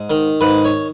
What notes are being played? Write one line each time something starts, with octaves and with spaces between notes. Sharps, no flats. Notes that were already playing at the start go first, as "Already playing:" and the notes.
Already playing: G#2
D#3
G#2 B4
C#5